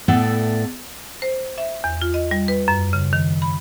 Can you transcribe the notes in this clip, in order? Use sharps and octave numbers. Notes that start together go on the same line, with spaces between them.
A2 B3 A4 D5 E5
C5
E5
E2
F4
D#5
G3
B4
F#2
C#3
D#3
B5